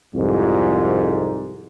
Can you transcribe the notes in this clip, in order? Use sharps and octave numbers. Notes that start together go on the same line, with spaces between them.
C2 F2 G#2